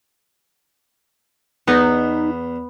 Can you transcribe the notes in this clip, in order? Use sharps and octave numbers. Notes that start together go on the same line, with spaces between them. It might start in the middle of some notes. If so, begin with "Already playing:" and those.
E2 B3 D#4